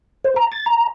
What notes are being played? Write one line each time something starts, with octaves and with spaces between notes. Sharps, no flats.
C5
A#5
A6
A#5